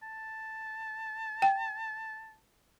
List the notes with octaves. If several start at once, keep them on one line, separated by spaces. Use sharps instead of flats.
A5
G5